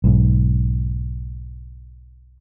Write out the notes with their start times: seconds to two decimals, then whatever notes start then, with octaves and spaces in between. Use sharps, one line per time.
0.04 B1 G#2